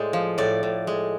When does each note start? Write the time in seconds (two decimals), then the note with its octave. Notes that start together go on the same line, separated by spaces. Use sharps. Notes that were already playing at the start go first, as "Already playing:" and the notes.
Already playing: A2 G#3 C5 D5
0.13 F3
0.38 A2 D5
0.63 A2
0.87 G#3